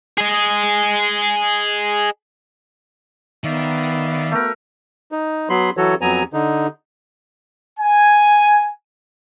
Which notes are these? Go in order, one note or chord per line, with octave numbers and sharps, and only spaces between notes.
G#4 D#5
D#3 B3 D5 E5 F5
A3 A#4
D#4
F#3 B3 B5 C6
E3 F#3 F#4 A4 C#5
F2 F#3 B3 G#5 A#5
D3 D#4
G#5